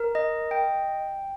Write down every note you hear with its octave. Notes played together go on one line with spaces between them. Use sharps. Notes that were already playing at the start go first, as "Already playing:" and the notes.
Already playing: A#4
D#5
G5